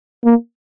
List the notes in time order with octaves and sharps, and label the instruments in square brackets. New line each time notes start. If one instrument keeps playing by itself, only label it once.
[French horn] A#3